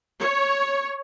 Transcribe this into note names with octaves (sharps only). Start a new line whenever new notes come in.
C#5